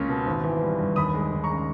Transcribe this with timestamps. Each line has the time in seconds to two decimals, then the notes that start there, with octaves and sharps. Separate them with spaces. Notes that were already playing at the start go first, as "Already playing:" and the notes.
Already playing: C#2 A#3 C#4
0.09 B2
0.26 G#1
0.44 E3
0.61 G3
0.79 G2
0.96 D#2 B5 D#6
1.14 G#3
1.32 D#2
1.44 A#5 C#6
1.50 C#3